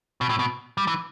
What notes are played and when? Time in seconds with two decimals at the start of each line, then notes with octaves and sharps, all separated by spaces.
0.21 B2
0.30 A2
0.39 B2
0.78 G3
0.87 E3